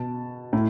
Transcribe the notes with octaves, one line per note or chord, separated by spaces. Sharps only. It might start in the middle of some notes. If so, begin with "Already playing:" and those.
Already playing: B2 A5
A2